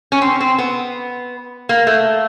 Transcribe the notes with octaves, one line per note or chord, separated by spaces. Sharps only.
C#4
C4
C4
B3
A#3
A3